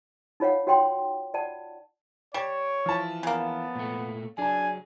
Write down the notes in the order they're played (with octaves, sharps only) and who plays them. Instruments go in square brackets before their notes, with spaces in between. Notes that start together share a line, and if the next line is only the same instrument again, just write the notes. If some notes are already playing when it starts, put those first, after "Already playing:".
[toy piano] D#4 F4 C#5 F5 F#5
F#4 C#5 F#5 G5 C6
F4 D5 F#5 A5
[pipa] G3 [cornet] C#5 [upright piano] D7 E7
[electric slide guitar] E3 E4 [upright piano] F3 A5
[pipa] C#3 A#3 [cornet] B3
[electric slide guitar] A#2 A3
[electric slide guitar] F#3 G#4 [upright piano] D4 A5 [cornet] G#5